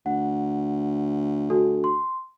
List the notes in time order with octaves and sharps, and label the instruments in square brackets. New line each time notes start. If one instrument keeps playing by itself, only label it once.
[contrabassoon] D2 [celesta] F#5
[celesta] D4 F#4 A4
C6